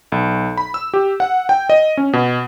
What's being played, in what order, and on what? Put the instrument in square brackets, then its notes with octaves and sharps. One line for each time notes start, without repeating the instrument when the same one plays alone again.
[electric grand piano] B1
B5
E6
G4
F#5
G5
D#5
C#4
B2